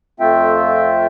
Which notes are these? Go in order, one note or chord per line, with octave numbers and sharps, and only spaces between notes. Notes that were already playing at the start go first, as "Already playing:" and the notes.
F2 A3 C4 F4 E5 G5